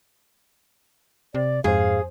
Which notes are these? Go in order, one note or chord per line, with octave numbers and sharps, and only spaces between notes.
C3 D5
F2 G#2 G#4 C5 F5